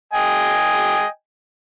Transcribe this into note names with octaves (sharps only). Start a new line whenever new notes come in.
D#5 G5 G#5